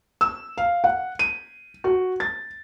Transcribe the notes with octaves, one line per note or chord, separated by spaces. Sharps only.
E6
F5
F#5
D#7
F#4
A6